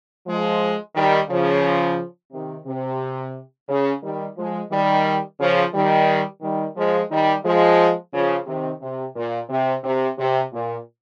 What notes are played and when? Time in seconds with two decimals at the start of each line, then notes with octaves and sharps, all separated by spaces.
0.26 F3 G#3
0.95 D#3 G3
1.29 C#3 F3
2.32 C3 D#3
2.66 C3
3.68 C#3
4.02 D#3 G3
4.36 F3 G#3
4.71 D#3 G3
5.39 C#3 F3
5.73 D#3 G3
6.42 D#3 G3
6.76 F3 G#3
7.10 D#3 G3
7.44 F3 G#3
8.13 C#3 F3
8.46 C3 D#3
8.81 C3
9.15 A#2
9.49 C3
9.84 C3
10.17 C3
10.52 A#2